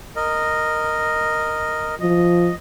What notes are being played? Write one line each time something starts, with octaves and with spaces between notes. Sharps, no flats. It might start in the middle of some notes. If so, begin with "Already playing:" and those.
A#4 D#5
F3 D#5